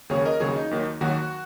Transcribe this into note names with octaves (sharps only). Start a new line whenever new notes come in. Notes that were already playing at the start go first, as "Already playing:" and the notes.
D#2 C#3 F#3 G#4 C#5
A#4 D#5
D#2 C#3 F#3 G#4 C#5
D#4
D#2 D#3 F#3
D#2 D#3 F#3 F#4